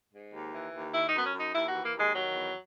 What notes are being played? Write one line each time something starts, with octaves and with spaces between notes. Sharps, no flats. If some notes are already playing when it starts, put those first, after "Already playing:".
G#2
D#2
E3
D#2
D#3 E4
D#4
F#2 B3
C#4
F#2 D#4
D#2 E4
F#4
E3
A#3
D#2 G#3
D#3 F#3
E2